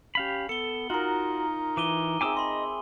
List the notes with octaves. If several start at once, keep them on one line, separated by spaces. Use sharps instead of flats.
C#4 G4 F5 B5
B3 A4 C#7 G7
D#4 F4 F#4 A#4
E3 D6 D#7 G7
C4 G#4 E5 G#5 D6 E6
D#5 B5 C6